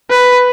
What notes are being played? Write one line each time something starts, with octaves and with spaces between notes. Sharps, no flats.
B4